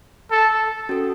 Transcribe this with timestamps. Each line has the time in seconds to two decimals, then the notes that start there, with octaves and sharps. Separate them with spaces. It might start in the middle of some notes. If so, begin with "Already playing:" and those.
0.31 A4
0.89 C#4 F#4 A4